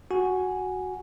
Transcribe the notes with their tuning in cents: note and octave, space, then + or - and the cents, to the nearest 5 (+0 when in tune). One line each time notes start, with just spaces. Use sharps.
F#4 +0 G#5 +0